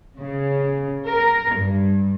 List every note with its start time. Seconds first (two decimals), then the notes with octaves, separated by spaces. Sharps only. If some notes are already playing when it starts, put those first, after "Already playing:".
0.18 C#3
1.06 A#4
1.53 G2